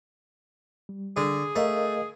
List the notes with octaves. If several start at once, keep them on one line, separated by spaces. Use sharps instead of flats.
G3
D3 G#4
A3 A#4 D#5 F5